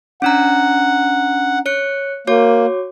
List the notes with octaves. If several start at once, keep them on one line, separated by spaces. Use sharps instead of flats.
C#4 D4 F#5 A#5
C#5 F#6 C#7
A#3 F#4 C#5 D6